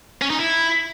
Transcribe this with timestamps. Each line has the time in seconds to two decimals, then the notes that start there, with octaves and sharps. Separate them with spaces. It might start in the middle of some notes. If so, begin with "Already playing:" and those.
0.22 C#4
0.30 D#4
0.39 E4